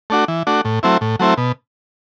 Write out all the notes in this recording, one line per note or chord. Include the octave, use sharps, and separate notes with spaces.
A3 D4 F#4
E3
A3 D4 F#4
A2
F#3 A3 C4 E4
A2
F#3 A3 C4 E4
B2